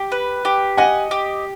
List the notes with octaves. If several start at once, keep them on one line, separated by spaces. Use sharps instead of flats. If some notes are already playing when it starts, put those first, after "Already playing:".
Already playing: G4
B4
G4
D#5 F#5 G#5
G4